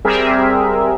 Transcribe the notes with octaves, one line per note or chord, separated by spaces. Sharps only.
G3 C4 G4 G#4 A#4 E5